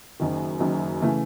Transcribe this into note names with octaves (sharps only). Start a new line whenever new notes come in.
F#1 F#2 D#3
F#1 F#2 D#3
C#3 E3 A3